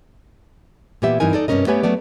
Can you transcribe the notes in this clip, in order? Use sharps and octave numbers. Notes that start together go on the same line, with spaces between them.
A#2 E3 B3 G4 E5
G2 E3 C4 D#4 A#4 G#5
D#4 A4 D5
G2 C3 A#3 C#4 A#4 D#5
A3 B3 G4 B4 C#5 G#5
F#3 A3 B3 D5